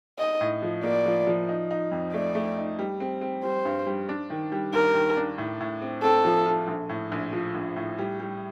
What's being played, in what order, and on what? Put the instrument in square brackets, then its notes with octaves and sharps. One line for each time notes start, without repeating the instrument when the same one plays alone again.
[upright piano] D#4 [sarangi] D#5
[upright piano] A2
F3
[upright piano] A#3 [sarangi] D5
[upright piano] F3
F3
D#4
D#4
F2
[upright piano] A3 [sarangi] D5
[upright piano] A3
D#4
G3
C4
C4
[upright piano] G3 [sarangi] C5
[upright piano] G2
G3
D4
D#3
G3
[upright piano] D#2 [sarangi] A#4
[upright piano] D#3
D4
A2
A2
C4
[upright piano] C4 [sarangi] A4
[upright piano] F3
F4
A#1
A2
A#1
F3
A#1
A2
G3
G3